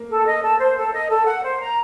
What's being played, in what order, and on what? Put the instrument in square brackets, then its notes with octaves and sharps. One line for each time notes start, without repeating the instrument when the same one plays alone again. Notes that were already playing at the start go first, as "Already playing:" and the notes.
Already playing: [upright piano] A#3
[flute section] A4
D#5
A4
C5
A4
D#5
A4
F#5
C5
A#5